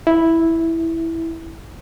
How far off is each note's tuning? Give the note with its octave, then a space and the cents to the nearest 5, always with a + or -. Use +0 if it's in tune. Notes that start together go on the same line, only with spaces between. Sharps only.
E4 -5